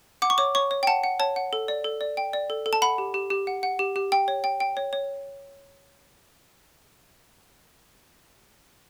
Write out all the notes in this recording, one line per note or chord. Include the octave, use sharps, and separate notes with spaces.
F#5 D6
C#6
C#5 D6
C#5 C#6
C#5
G5
F#5 A5
F#5
C#5 A5
F#5
A4
D5
A4
D5
G5
D5
A4
A4
A5
F#5 B5
G4
G4
G4
F#5
F#5
G4
G4
G5
C#5
G5
G5
C#5
C#5